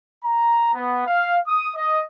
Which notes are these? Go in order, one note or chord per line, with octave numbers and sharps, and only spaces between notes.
A#5
B3
F5
D#6
D#5